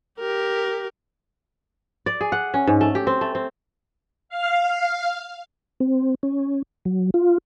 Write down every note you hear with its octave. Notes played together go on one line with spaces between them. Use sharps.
G4 A#4
D5
G#4
F#5
C#4
G#2
A3
G4
C4
A3
C4
F5
C4
C#4
F#3
F4